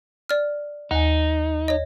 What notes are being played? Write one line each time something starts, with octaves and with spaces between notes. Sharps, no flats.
D5 F6
D#2 D#4 G#5
C#5 D#5